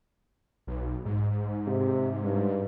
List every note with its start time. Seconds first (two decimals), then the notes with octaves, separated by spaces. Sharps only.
0.67 B1
1.05 G#2
1.67 C3
2.23 G2